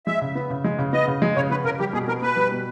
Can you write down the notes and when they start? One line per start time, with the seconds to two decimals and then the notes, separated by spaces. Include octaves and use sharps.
0.06 G#3 E5
0.22 C#3
0.35 B3
0.50 C#3
0.64 G#3
0.79 C#3
0.93 B3 D#5
1.08 C#3
1.22 G#3
1.36 C#3 C#5
1.50 B3 B4
1.65 C#3 A#4
1.80 G3 G4
1.93 B2 G#4
2.08 B3 A#4
2.22 B2 B4
2.36 G3
2.51 B2